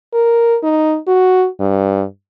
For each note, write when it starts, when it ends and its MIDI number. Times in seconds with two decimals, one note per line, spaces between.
0.14 0.58 70
0.64 0.97 63
1.08 1.47 66
1.60 2.04 43